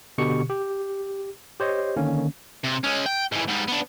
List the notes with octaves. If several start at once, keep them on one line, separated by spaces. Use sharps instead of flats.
B2 D3 G4 C#6 C#7
G4
G4 C5 C#5 D#5
D3 D#3 A#3 C#4
C3
G#3 C#4
G5
G#2 E3
G#2 G3
B3 D4